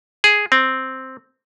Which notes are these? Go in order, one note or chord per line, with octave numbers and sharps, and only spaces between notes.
G#4
C4